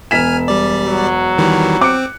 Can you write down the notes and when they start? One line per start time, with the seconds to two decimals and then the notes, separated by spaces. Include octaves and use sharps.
0.11 E1 G#5 F6 B6 E7
0.48 G3 D5
0.85 F#3
1.38 D#3 E3 G3
1.81 C4 D6 F#6 C#7